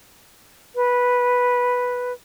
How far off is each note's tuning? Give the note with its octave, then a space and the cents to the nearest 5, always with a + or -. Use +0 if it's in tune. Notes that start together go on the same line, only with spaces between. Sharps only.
B4 -5